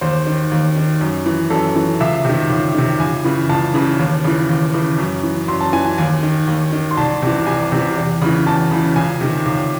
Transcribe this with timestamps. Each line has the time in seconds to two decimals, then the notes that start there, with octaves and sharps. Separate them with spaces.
0.01 D#2 C5
0.27 D#3
0.51 D#2
0.76 D#3
1.01 F#2
1.26 E3
1.50 F#2 A4
1.76 E3
2.00 C#2 E5
2.25 C3 D#3
2.50 C#2
2.75 C3 D#3
3.00 C#2 G#5
3.25 C#3 E3
3.50 C#2 A5
3.74 C#3 E3
3.99 D#2
4.24 C#3 E3
4.49 D#2
4.74 C#3 E3
4.98 F#2
5.24 E3
5.48 F#2 C6
5.61 A5
5.73 E3 G#5
5.85 G#5
5.98 D#2 G#5
6.23 D#3
6.47 D#2
6.72 D#3
6.91 C6
6.97 C2 A5
7.22 C3 E3
7.46 C2 G#5
7.72 C3 E3
7.97 E2
8.22 C#3 E3
8.46 E2 A5
8.71 C#3 E3
8.96 C#2 G#5
9.21 C3 D#3
9.46 C#2